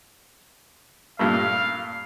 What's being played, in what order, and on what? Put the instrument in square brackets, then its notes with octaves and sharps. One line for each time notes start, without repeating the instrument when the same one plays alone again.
[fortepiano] G2 A#2 A3 [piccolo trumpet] F5